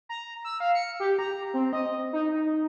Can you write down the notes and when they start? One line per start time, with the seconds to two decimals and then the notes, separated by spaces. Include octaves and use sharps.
0.09 A#5
0.44 E6
0.60 F5
0.75 C#7
1.00 G4
1.19 A#5
1.54 C4
1.73 D#5
2.13 D#4
2.32 D#4